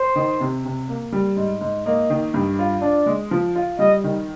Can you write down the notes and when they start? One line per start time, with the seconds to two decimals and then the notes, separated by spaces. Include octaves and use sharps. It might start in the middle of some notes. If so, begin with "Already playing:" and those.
Already playing: C5
0.16 D#3
0.40 C3
0.65 C3
0.88 A#3
1.12 G3
1.36 G#2
1.61 G#2
1.85 A#3 D#5
2.10 D#3
2.34 G2
2.59 F4
2.82 D4 D5
3.06 G#3
3.31 F3
3.55 F4
3.79 G3 D#5
4.04 D#3